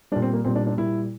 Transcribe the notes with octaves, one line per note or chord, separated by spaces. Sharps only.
A#2 G3 D4
C4
A#3
A#2 G3 C4
D4
D4
A#2 G3 E4